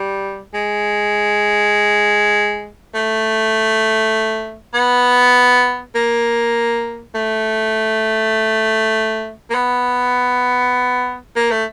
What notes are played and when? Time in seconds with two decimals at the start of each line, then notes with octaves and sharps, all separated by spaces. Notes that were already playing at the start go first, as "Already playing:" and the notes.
Already playing: G3
0.54 G#3
2.95 A3
4.74 B3
5.95 A#3
7.15 A3
9.50 A#3
9.55 B3
11.36 A#3
11.51 A3